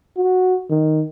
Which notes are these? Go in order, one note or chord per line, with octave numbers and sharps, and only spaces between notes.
F#4
D#3